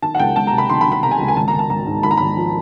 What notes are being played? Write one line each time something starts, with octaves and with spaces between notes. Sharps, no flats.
D#3 A5
F#5
C#2 G5
C#2 A5
A#5
C3
B5
D#3 C6
B5
D#3
B5
C3 A#5
G#5
C#2
G#5
G#1 A5
A#5
G#1
A5
G#1 A#5
G#2
G#1 B5
A#5
G#1 B5
F3